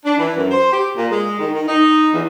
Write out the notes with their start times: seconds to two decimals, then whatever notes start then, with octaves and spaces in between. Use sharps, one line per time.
0.05 D4
0.18 E3
0.37 F#2
0.51 C5
0.72 G4
0.97 A#2
1.11 G#3
1.39 D#3
1.53 D#3
1.68 D#4
2.14 E2